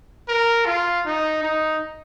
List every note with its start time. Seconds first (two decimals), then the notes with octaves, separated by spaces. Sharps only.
0.28 A#4
0.66 F4
1.05 D#4
1.43 D#4